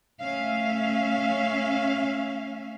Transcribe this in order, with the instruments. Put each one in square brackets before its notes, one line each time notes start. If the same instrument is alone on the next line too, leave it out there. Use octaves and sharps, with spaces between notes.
[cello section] A3 C#4 E5 F5